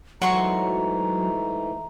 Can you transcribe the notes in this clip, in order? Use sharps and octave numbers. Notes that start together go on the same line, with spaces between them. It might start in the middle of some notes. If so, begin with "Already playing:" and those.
G#2 E3 F#3 A3 F#4 A#5 C6 C#6